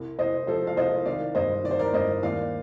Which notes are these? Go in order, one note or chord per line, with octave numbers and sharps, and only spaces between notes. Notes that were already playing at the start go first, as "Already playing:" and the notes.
Already playing: C2
C2 C5 D#5
F3 A4 C5
F5
C2 C5 D#5
D#3 D5 F5
G2 C5 D#5
D#3 D5
C5
A#4 D5
G2 C5 D#5
D#2 D5 F5